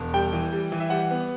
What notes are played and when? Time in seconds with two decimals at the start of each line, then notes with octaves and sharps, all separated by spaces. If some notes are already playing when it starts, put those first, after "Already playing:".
Already playing: E1
0.14 G3 G5
0.33 E3
0.53 G3
0.72 E3
0.80 E5
0.90 G3 F#5
1.11 B3